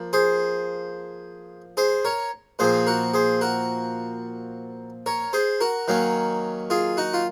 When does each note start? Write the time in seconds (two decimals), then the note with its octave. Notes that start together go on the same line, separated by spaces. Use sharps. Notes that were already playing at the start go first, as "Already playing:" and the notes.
Already playing: F3 A#3
0.13 G#4 C5
1.77 G#4 C5
2.05 A#4 C#5
2.59 A#2 F3 C4 G#4 C5
2.87 F#4 A#4
3.14 G#4 C5
3.41 F#4 A#4
5.06 A#4 C#5
5.33 G#4 C5
5.61 F#4 A#4
5.88 D#3 F#3 A#3 C#4
6.70 F4 G#4
6.97 D#4 F#4
7.13 F4